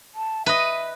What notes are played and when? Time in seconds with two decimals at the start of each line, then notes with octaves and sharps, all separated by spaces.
0.15 A5
0.46 B4 D#5 E5